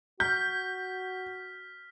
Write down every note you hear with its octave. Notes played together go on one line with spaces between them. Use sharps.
F#4 F6 G6 B6